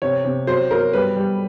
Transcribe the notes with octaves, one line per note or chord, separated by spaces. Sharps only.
C3 C#5
C3
F#3 C5
F#3 A#4
G3 B4
G3